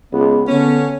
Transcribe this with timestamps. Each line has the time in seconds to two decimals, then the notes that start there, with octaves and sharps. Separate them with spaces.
0.12 C#2 B3
0.48 D3 B3 C#4